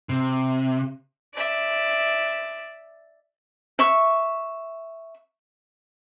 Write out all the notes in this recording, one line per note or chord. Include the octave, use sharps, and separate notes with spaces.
C3
D5 E5
E5 C#6